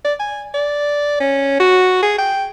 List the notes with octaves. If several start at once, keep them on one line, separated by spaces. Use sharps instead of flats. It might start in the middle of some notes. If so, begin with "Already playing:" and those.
D5
G#5
D5
C#4
F#4
G#4
G5